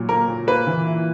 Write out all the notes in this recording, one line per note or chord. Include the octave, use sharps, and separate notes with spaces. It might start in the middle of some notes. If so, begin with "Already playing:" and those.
Already playing: A#2 F#3
A#3 A#4
A#2
A#3 B4
E3
E4